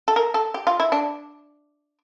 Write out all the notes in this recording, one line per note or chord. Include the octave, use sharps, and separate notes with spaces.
A4
A#4
A4
G4
F4
E4
D4